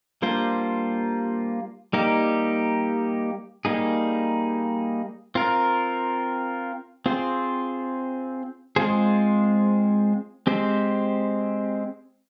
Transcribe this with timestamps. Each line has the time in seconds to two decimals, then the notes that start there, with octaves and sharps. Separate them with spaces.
0.22 G3 A#3 D4 F4 C5
1.93 G3 A#3 D#4 G4
3.65 G3 A#3 D#4 G#4
5.35 C4 F4 A#4
7.06 C4 F4 G#4 C5
8.76 G#3 C4 F4 G#4 C5
10.47 G#3 C4 G4 C5